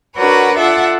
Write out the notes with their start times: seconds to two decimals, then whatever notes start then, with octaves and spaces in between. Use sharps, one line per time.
0.16 D4 F#4 A#4 B4 C#5 F#5
0.58 F4 A4 D5 E5 F#5